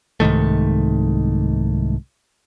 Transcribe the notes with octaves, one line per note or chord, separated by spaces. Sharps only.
C2 G#2 D#3 A3